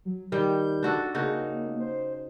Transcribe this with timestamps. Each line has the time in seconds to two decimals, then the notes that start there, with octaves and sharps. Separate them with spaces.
0.05 F#3
0.32 D#3 G3 G6
0.83 D4 F#4 A4
1.14 C#3 A#3 D#4 F#4
1.80 C5